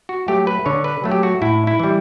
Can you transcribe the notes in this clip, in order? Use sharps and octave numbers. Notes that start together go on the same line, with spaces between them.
F#4
F#3 A3 G4
B4
D3 C#5
B4
F#3 A3
G4
F#4
A2 E4
E4
E3 G3